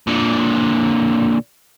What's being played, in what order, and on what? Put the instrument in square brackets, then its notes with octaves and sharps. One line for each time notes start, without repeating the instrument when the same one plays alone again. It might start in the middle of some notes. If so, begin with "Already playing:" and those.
[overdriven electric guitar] A#2 D3